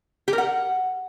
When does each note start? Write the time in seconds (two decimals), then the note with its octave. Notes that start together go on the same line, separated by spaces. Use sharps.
0.28 G4
0.33 A#4
0.38 F#5